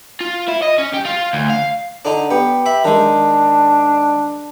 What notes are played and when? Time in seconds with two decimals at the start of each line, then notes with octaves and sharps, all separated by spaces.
0.20 F4
0.48 E4
0.62 D#5
0.78 C#4
0.94 G4
1.06 F4
1.33 D2
1.50 F5
2.05 D3 D4 D#4
2.31 B3 G4
2.66 E5 B5
2.85 D#3 G#3 D4